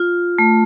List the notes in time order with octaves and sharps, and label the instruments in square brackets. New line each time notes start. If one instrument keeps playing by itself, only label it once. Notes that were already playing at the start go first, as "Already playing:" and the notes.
Already playing: [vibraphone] F4
A3